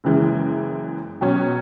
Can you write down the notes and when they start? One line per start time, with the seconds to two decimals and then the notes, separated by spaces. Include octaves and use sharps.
0.04 F#1 F#2 E3 G#3
1.21 B2 F#3 C#4